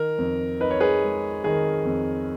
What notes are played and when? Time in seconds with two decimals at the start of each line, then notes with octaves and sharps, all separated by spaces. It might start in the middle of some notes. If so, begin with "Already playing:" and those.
Already playing: D#3 A#4
0.18 F2
0.60 D#4 B4
0.71 C#5
0.80 G#4 B4
1.02 G#3
1.44 D#3 G#4
1.85 F2